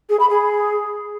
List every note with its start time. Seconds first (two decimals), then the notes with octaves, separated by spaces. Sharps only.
0.09 G#4
0.20 B5
0.30 G#4